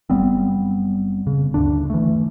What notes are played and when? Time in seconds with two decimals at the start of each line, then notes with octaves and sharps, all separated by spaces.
0.10 F#1 G3 B3 C4
1.27 C#3
1.54 D2 G2 D3 D4
1.90 E3 A3